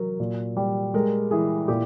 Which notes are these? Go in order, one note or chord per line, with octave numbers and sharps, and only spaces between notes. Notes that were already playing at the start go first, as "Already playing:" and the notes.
Already playing: F#3 A#4
A#2
G3
G#3 A#4
E3 G#4
A#2 G4